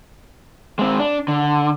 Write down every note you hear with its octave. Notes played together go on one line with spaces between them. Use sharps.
G#3 C4
D4
D3